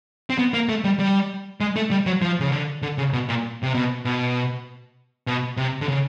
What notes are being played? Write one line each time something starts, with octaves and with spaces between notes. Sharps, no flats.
C4
B3
A#3
A3
G3
G3
G#3
A3
G3
F#3
F3
C#3
D3
D3
C#3
B2
A#2
C3
B2
B2
B2
C3
D3
C#3